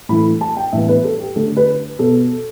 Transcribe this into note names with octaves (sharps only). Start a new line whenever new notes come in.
A2 E3 A3 B5
A5
G5
A2 E3 G3 B3 E5
B4
A4
G4
D3 A3 A4
B4
B2 B3 A4